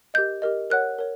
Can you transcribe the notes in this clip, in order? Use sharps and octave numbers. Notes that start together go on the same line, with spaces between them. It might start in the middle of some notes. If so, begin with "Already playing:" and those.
G4 A#4 D#5 G6
G4 A#4 D#5
A#4 C#5 F#5 F#6
A#4 C#5